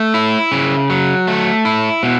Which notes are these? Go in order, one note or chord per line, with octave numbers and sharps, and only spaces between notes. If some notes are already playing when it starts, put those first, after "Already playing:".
Already playing: A3
E4
C#3
F#3
A3
E4
B2